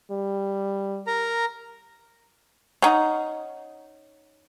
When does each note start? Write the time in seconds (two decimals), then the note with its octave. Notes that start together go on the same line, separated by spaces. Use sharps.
0.11 G3
1.07 A#4 A#5
2.82 C#4 D#4 F#5